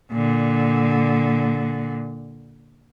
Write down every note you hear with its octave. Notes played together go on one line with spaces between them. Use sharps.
A#2 D3